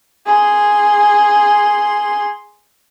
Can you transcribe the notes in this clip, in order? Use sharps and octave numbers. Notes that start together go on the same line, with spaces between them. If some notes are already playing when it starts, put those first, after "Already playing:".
G#4 C6